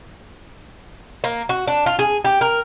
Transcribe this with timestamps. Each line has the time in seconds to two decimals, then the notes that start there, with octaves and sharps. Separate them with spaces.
1.24 A#3
1.49 F#4
1.68 D4
1.86 F4
1.99 G#4
2.25 G4
2.41 A#4